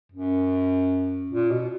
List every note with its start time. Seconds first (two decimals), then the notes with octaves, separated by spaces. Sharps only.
0.12 F#2
1.31 A#2
1.51 B2